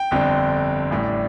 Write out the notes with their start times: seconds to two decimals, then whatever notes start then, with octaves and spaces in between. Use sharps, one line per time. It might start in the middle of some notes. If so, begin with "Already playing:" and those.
Already playing: G5
0.11 G1 F2 D3 G3 C4
0.90 A1 A2 G3 D4